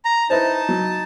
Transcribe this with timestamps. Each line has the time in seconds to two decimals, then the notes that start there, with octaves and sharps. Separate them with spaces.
0.05 A#5
0.30 D#4 E4 B4 C5 A5
0.69 F#3